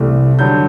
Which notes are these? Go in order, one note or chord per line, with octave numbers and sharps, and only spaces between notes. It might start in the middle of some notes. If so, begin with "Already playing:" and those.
Already playing: C2 C3 E3 A3
G2 D3 F#3 G6